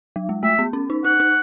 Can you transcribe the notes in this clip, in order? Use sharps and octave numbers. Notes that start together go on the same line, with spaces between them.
F#3
G#3
A3 E5
B3
C#4
D#4
D#4 F#5
D#4